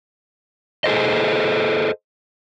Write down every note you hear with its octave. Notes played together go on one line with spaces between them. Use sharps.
G#4 A4 C5 D#5